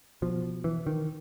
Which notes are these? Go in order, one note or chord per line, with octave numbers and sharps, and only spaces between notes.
B2 F3
E3
D#3